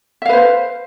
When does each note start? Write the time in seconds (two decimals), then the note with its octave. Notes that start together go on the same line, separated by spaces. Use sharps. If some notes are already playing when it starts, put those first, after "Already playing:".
0.22 E5
0.25 F5
0.29 B4
0.33 C5